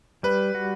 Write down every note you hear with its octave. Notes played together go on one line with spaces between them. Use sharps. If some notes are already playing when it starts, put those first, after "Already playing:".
G3 B4
F#4